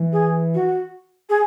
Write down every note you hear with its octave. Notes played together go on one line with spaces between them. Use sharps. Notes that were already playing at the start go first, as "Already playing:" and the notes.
Already playing: E3
G#4
F#4
G#4